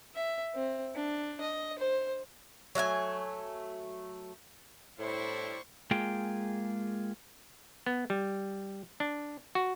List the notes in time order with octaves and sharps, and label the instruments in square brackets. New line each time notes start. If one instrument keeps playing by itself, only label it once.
[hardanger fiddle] E5
C4
D4
D#5
C5
[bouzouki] F#3 A3 F5 G#5
[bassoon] A2 [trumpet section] G3 D4 E4 [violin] C5 C#6
[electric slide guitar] G#3 A#3 F4 G#4 G5
[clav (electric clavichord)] B3
G3
D4
F#4